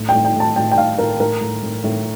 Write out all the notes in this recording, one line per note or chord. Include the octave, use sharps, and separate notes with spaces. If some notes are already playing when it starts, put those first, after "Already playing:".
Already playing: A2
G5
A2
G5
A2
A5
A2 G5
G5
A2 F5
A2 A#4
A2 A#4
A2
A2
A2